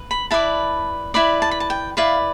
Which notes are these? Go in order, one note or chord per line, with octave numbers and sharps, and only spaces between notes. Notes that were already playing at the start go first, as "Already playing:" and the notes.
Already playing: B4
B5
E4 B4 D5 A5
E4 B4 D5 B5
A5
B5
A5
G5
E4 B4 D5 F5